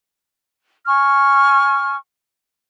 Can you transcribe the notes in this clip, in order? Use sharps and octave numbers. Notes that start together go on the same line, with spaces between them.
G#5 C#6 F6